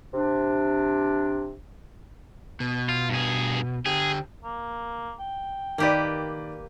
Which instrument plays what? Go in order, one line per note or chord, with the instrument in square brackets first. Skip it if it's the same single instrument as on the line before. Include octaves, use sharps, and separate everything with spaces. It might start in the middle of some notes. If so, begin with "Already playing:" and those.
[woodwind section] C3 D4
[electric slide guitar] B2
[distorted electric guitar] F4
G2 G#4
[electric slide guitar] D3 G4 [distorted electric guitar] G#4
[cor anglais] A#3
G5
[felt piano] D#3 D5 [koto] A#3 G4 B4